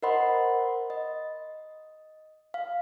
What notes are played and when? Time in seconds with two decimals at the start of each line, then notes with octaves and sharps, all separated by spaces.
0.03 A#4 C5 D#5 F#5 B5 C6
0.90 D#5
2.54 F5